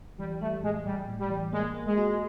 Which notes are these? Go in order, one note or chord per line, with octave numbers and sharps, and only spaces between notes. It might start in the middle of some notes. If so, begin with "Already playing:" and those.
E3 G3
G3 A3
A2 G#3
A2 G3
A2
G3
E3
G#3 A#3
A#3
G#3
F#4